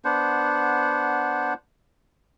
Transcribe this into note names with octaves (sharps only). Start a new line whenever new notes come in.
B3 D4 C5 F#5